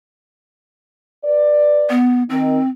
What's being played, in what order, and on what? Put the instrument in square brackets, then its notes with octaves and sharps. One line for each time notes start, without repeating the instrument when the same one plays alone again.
[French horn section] B4 D5
[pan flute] B3
[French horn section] D#3 D#4 [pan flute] C4